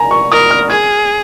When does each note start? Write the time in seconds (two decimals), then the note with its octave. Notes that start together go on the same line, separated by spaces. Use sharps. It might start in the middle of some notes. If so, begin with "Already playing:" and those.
Already playing: G#5 A#5
0.11 C#6
0.32 A#4 D#6
0.51 F6
0.70 G#4 G#6